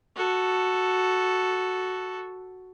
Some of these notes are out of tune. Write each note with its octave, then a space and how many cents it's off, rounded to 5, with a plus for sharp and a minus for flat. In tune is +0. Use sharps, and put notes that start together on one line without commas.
F#4 +0 A4 +0